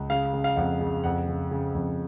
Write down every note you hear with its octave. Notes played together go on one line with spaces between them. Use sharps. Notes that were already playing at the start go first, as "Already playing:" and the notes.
Already playing: C#2
C#3 F5
C#3
F5
F2 F#5
C#3
F2 F#5
C#3
C#3
F2